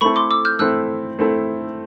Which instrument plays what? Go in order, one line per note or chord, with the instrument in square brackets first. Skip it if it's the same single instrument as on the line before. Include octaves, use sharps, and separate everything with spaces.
[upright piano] A3 C4 E4 A4 [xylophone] B5 C#6
[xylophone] C6 D6
D6 E6
F6 G6
[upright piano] A3 C4 E4 A4 [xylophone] E6 F#6
[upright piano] A3 C4 E4 A4